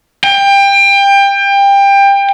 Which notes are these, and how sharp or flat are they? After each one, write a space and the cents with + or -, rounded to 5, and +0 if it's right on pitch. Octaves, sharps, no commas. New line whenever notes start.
G5 +25